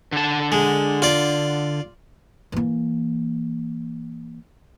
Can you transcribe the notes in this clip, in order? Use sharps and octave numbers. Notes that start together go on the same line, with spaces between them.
D3 A5
G#3
F4 D5
E3 A#3